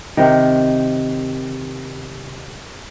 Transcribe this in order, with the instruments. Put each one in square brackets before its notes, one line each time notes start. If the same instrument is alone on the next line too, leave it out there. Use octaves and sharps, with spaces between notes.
[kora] C3 D#3